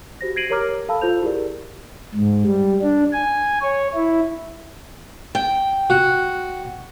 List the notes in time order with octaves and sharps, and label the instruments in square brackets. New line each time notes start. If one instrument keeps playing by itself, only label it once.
[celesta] F#4 G4 C5 A#6
G#6 A#6 C7 D7 D#7 F#7
G4 A#4 C#5 A#5 D6 F6
A4 F5 A5 B5 E6
F4 A4 C5 G6 F7
E4 G4 G#4 A#4 D5
[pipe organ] G#2
G3
D4
G#5
C#5
E4
[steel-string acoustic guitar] G5
[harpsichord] F#4